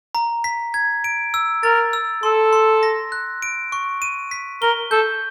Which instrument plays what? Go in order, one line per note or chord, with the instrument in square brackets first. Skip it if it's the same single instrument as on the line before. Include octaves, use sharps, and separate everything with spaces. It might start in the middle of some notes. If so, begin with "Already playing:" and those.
[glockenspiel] A#5
B6
G#6
D7
E6
[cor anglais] A#4 [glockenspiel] A6
[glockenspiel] E6
[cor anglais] A4 [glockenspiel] C6
[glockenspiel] C6
A#6
F#6
D7
C#6
D#7
B6
[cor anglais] A#4 [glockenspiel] G7
[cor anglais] A4 [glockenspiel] G6